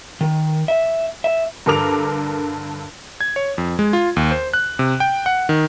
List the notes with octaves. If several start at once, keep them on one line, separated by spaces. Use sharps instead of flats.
D#3
E5
E5
G2 D3 A4 A#4 D6 F7
G#6
C#5
F2
G#3
F4
D#2
C5
F#6
C3
G5
F#5
D#3